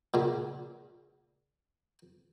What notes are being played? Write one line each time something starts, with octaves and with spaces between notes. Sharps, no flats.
A#2 C#3